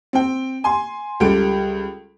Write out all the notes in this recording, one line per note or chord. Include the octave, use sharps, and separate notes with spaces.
C4 G5
G#5 C6
C#2 G3 A4 D7